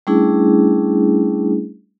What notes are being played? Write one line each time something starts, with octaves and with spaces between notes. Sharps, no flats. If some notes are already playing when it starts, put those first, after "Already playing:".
G3 A3 C#4 D4 E4 G#4